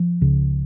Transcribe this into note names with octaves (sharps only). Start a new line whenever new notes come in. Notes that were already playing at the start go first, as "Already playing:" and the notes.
Already playing: F3
C#2 C#3